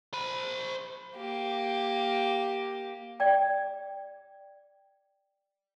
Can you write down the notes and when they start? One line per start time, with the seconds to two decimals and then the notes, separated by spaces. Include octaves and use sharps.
0.13 C5 B5
1.17 A#3 G4
3.20 D5 G5